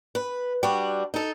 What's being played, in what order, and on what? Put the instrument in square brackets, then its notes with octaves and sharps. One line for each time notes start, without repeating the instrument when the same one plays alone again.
[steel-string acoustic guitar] B4
G3 D4 F#4
D#4 A4